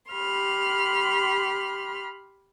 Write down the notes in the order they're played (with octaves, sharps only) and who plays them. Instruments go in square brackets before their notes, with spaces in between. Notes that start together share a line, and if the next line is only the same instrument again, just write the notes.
[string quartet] G4 B5 C6 F6